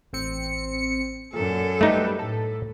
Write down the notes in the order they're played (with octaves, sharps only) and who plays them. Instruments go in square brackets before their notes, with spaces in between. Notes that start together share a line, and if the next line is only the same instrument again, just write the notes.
[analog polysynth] A1 C4 C#7
[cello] F#2 A4 [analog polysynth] A#2
[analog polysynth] G3 G4 B4 [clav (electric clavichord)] A3 D#4
[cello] A2 [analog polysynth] A4